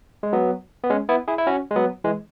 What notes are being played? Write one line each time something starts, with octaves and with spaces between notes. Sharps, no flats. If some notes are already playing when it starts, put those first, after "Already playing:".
G#3
F#3 B3
B3
G#3 C#4
B3 E4
E4 G#4
E4
C#4 F#4
G#3
F#3 B3
E3 G#3